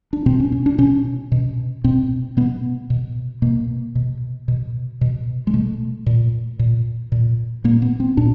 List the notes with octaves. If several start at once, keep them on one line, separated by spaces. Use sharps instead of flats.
D4
B2 C4
C#4
C#4
D4
B2 C#4
B2
B2 C4
B2 B3
B2
B2 A#3
B2
B2
B2
G#3
B2 A3
A#2
A#2
A#2
A#2 A#3
B3
C4
A#2 D4